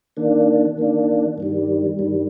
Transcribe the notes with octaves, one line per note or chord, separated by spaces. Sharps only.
D#3 A#3 D4
D#3 A#3 D4
G2 D#3 G3
G2 D#3 G3